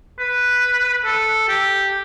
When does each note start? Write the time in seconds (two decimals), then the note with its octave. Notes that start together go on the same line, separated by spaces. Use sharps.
0.19 B4
1.05 A4
1.48 G4